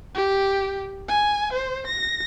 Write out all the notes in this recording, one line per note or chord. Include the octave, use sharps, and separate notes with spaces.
G4
G#5
C5
A#6